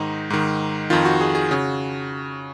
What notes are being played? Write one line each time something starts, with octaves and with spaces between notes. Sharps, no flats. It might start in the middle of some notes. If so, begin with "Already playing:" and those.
Already playing: G#2 D#3 D#4
G#2 D#3
F2 D#3 F4
F#4
G#4
G#4
C#3 F#4